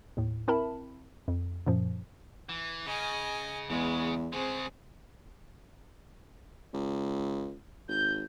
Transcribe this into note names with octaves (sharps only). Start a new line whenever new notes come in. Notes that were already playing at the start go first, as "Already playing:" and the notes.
D#2 A2
C4 E4 A#4 E5 A5 B5
F2
F#2 A#2 F3
E3
C#3 D#5 G#5
E2 C#3 G#3 B3
C#3 G#3 C4 G#4
C#2
G#1 G6